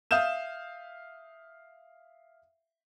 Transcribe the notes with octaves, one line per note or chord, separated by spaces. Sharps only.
E5 F5 D#6 G6 E7